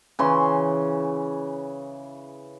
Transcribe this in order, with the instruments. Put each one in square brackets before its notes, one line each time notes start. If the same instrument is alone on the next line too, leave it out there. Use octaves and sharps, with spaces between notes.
[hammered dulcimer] C#3 E3 C6